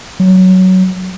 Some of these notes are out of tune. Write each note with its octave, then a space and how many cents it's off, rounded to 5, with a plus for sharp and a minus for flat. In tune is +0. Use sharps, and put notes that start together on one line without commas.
F#3 +10